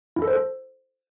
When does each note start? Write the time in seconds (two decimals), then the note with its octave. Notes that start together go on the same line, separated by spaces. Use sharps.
0.16 E4
0.22 A4
0.27 C5
0.33 A4